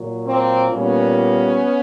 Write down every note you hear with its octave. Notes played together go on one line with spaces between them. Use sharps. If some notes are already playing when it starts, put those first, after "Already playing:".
Already playing: A#2 F#3
A#3 C4
A#2 G3 A#3 B3 C#4